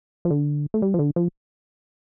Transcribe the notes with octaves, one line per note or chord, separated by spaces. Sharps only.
F3
D3
A3
G3
F3
D3
F3